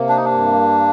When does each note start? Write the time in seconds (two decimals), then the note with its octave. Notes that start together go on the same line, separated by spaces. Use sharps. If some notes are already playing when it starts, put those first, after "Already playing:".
Already playing: C3 A#3
0.09 D4
0.17 D#4
0.25 D4
0.31 G2